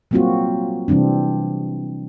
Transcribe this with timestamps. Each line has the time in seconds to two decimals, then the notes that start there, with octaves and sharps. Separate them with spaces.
0.11 F#3 G3 A#3 C4 F4 F#4
0.88 C3 E3 G3 C4 D4